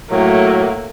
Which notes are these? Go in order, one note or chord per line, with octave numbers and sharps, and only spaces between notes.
A2 F#3 A3 A#3